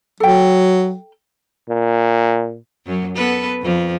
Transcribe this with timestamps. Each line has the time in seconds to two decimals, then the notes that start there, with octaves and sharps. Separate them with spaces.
0.20 F#3 A4 G5
1.70 A#2
2.86 F#2 F#3
3.15 B3 A4 B4
3.62 F2 F3